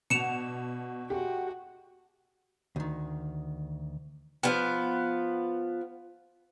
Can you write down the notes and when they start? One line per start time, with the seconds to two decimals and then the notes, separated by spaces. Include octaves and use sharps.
0.10 B2 D4 F#4 C#7 E7 F7
1.10 G#3 A3 F#4 G4
2.76 D2 D#3
4.43 F3 B3